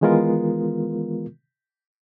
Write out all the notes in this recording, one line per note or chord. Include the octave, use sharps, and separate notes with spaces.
D#3 E3 G#3 B3 F4 A#4